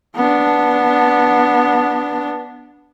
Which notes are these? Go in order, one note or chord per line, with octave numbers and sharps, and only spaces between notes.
B3 D4